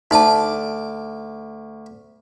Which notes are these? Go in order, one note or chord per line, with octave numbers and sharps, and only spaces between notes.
D2 D#4 D5 A5 D6